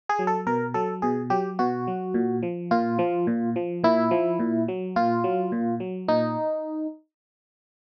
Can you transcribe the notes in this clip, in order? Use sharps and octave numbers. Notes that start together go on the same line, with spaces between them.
G#4
F#3
A4
B2 A#4
F#3 A4
B2 G#4
F#3 G4
B2 F#4
F#3
A#2
F3
A#2 F4
F3
A#2
F3
A#2 E4
F3
A#2
F#3
A#2 F4
F#3
A#2
F#3
A#2 D#4